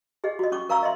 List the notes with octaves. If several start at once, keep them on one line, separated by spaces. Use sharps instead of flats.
G4 G#4 D#5
F#4 D#5
C#4 C#6 D6
A#4 F5 A#5 C#6 E6
D#5 E5 C6